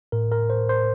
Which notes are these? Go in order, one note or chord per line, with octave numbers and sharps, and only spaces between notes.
A2 A#4
A#4
C5
C5